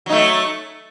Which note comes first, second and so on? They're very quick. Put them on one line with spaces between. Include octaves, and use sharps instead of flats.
F#3 D#4 A3